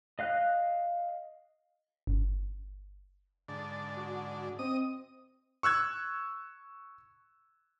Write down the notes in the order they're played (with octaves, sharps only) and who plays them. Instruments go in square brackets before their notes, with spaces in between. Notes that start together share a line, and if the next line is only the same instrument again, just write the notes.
[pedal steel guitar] D#5 F5 F#6
[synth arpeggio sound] G1
[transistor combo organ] G#2 D3 D4 [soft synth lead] A6
[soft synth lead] F#4
[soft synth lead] C4 [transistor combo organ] D#5 D#6
[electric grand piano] C#6 E6 F#6 G#6